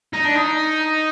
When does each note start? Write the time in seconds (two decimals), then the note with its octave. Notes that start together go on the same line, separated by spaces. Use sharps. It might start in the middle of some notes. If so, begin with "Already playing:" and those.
0.13 D#4
0.25 D4
0.35 D#4